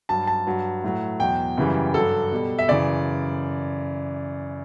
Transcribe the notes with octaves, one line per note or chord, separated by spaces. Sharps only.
G2 F#3 A5
A5
G2 F#3
A2 F#3
E2 B2 F#3 G5
F#2 C#3 E3 G3
G2 F#3 A4
B2 G3
E5
F#2 C#3 E3 D5